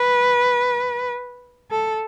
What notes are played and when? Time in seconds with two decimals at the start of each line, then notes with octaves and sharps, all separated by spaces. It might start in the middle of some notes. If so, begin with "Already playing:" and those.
Already playing: B4
1.71 A4